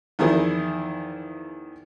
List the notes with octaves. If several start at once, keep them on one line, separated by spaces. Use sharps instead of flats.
E2 D#3 F3 E4 G#4 A#4